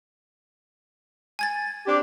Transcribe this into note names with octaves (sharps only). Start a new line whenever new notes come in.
G#5 G#6 A6
C4 D4 G4